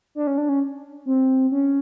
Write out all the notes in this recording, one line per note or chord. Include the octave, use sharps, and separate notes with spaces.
D4
C#4
D4
C#4
C4
C#4